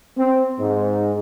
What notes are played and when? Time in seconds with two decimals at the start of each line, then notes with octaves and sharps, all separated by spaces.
0.17 C4
0.60 G#2